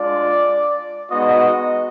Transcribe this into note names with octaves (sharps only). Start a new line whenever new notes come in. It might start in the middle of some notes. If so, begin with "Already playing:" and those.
Already playing: G#3 D4 F4 D5
G#3 B3 D#4 F#4 D#5